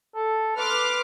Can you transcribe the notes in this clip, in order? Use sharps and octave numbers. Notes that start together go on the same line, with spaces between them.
A4
B4 C6 D6 F6